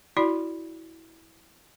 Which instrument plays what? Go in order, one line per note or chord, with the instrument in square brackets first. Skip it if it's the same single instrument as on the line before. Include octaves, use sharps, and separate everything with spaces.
[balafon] E4 F#4 D5 B5